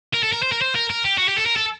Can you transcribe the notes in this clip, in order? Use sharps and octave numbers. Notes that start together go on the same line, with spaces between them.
A#4
A4
A#4
C5
A#4
C5
A#4
A#4
G4
F#4
G4
A4
A#4
A4